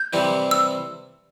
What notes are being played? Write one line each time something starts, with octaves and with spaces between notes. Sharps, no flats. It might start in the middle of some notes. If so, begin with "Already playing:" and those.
Already playing: G6
C3 E3 G3 C4 E4
E6